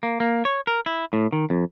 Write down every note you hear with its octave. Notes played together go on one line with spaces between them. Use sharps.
A#3
A#3
C#5
A#4
E4
A2
D#3
F2